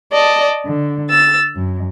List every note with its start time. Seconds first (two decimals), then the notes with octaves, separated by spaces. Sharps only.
0.12 D5 D#5 A5
0.65 D3
1.09 E6 A6
1.55 F#2